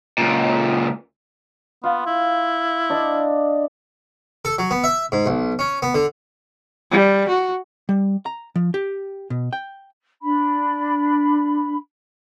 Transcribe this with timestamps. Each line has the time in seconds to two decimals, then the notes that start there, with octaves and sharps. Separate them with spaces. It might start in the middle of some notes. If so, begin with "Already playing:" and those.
0.18 C#2 A#2
1.84 B3 F4
2.06 E4
2.90 D4 D5 D#5
4.45 A4
4.58 F#3
4.71 B3
4.84 E5
5.12 G#2
5.26 B1
5.59 C#4
5.82 B3
5.95 D3
6.92 G3
7.29 F#4
7.89 G3
8.26 A#5
8.56 F3
8.74 G4
9.30 B2
9.53 G5
10.22 D4 B5